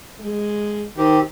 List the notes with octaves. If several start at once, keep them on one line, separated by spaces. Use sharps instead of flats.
G#3
D#3 C4 G4